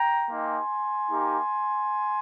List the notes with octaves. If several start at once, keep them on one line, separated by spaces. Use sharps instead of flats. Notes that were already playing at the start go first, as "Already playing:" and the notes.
Already playing: G5 A#5
A#3 D#4 G4 G#5 C6
A#3 D#4 G4